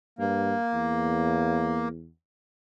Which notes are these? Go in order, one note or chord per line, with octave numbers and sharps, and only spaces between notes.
G2 A#3
E2